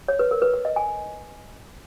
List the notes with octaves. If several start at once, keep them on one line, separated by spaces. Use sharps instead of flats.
C#5
B4
A#4
B4
B4
D#5
G#5